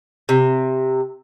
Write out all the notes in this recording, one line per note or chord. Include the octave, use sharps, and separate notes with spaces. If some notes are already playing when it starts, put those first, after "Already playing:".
C3